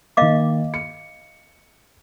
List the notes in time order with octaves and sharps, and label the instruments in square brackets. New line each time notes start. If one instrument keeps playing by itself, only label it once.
[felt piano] D#3 A#3 [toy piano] D#5 F5 D6
[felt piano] C#7